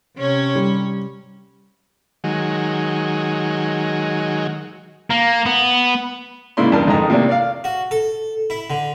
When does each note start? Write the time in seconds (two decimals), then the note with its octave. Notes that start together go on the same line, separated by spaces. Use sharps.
0.17 C3 C#4 C#5
0.55 G3
2.24 D#3 F#3 G#3
5.11 A#3
5.46 B3
6.57 G#2 C#3 A#3 E4 D5 C6
6.72 E2 G2 D4 A#4 A5 C6
6.87 F2 G#2 D#3 A#5
7.10 C3 A3 A#3 D4 D5
7.29 D5 F5
7.64 F#4
7.91 A4
8.50 E4
8.70 D3